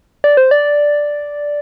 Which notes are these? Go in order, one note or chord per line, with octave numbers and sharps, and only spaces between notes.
D5
C5
D5